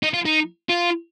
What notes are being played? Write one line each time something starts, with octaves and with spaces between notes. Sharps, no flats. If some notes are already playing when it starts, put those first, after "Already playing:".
D#4
F4
D#4
F4